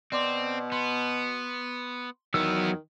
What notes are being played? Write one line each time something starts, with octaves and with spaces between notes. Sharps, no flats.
B2 C4 D5 C6 D6
B3 C6
E2 D#3 F#3 B3 E6